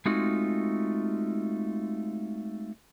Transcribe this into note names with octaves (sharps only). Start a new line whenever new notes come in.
G#3 A3 C4 D#4 F4 F#4